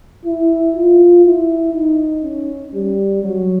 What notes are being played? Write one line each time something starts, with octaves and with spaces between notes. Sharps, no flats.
E4
F4
E4
D#4
C#4
G3
F#3